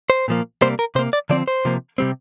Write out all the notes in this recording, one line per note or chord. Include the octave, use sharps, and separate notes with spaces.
C5
A#2 F3 A#3
C3 G3 A#3 C5
A#4
C3 A#3 C5
D5
D3 F3 C4 D5
C5
C3 F3 A#3
C3 G3 C4